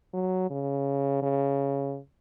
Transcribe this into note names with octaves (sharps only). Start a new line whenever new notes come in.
F#3
C#3
C#3